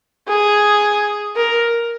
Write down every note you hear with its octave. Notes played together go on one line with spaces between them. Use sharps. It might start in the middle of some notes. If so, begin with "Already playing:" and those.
G#4
A#4